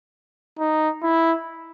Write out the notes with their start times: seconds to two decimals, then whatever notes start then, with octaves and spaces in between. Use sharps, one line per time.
0.59 D#4
1.03 E4